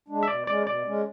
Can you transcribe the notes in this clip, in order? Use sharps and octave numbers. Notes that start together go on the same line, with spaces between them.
G#3 D4
E5
B2 D5
G#3 C#4 D5
B2 D5
G#3 C#4